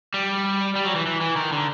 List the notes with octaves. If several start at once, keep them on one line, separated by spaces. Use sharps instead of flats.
G3
G3
F#3
E3
E3
E3
D#3
D3